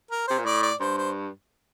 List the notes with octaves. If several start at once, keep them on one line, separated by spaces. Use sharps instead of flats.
A#4
C3 C5
A#2
A2 D5
D5
G2 C5
C5